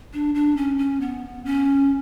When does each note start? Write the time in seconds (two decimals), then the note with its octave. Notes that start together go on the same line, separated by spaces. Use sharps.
0.14 D4
0.35 D4
0.57 C#4
0.78 C#4
1.01 B3
1.45 C#4